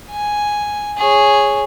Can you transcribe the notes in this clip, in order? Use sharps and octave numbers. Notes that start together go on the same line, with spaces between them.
G#5
G#4 C#5